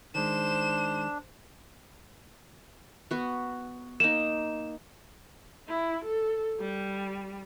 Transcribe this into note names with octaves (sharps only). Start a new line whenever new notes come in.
D#3 G#3 D4 C5 E7
B3 F#4
A#3 D#4 E7
E4
A4
G3